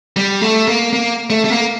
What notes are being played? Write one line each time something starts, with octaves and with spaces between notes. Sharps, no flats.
G3
A3
A#3
A#3
A3
A3
A#3